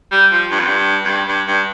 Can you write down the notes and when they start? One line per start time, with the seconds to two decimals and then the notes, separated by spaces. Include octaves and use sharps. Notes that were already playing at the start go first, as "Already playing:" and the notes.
0.12 G3
0.32 F3
0.51 G2
0.60 F2
0.68 G2
1.05 F2
1.09 G2
1.28 G2
1.48 G2